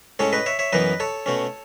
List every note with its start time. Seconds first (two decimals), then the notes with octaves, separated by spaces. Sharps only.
0.19 A2 G#3 C#4 A4 C#5
0.33 B4 D#5
0.46 C#5 E5
0.59 C#5 E5
0.73 F#2 E3 B3 B4 D#5
1.00 A4 C#5
1.26 B2 A3 C#4